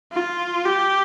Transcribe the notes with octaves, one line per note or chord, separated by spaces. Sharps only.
F4
G4